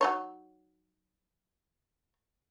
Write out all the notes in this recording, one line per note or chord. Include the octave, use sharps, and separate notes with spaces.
F#3 D#4 C#5